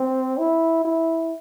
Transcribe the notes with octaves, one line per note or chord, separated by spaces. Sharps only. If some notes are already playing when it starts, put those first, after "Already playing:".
Already playing: C4
E4
E4